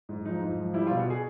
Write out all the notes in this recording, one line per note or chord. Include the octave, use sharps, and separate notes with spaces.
G#2
F3 D#4
G#2
F3
G3 E4
F4
B2
F#4
G#4